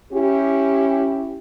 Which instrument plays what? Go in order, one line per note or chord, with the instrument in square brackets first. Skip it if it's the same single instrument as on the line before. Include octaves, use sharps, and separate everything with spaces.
[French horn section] C#4 E4 G4